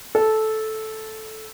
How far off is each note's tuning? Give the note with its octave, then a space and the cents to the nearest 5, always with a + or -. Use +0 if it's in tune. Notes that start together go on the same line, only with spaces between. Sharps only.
A4 -10